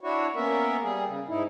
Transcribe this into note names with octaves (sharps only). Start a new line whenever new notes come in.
D4 E4 F#4 C#5
A#3 B3 C#4 A#4 E5
G3 G#4
C#3
G#2 D#4 E4